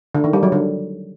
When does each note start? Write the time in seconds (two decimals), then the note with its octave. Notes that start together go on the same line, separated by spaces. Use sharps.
0.15 D3
0.24 D#3
0.33 G3
0.43 F#3
0.52 D3